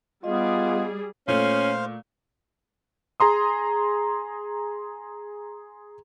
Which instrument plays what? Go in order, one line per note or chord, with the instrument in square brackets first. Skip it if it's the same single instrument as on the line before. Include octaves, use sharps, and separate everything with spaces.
[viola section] G3 G#4 [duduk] B3 [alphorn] F4 [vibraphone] D#5
[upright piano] A#2 A3 [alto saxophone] C#4 [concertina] C5 F5
[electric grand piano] G#4 A#5 C6 D#6